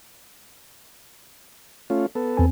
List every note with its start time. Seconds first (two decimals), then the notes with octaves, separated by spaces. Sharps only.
1.90 A3 C#4 F4
2.15 B3 A4
2.37 E2 C4 G#5